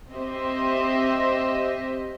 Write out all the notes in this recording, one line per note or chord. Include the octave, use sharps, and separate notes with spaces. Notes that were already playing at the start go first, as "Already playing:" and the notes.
C4 G4 C5 D#5 E5